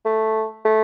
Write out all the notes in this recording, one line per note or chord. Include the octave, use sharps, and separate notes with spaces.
A3
A3